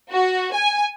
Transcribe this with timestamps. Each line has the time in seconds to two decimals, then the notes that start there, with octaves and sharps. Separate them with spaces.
0.11 F#4
0.53 G#5